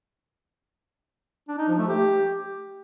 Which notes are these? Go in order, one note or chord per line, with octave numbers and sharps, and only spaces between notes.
D4
D#4
F3
A3
G4